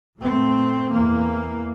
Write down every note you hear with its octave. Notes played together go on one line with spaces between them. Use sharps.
A#2 A3 C4
E2 E3 A#3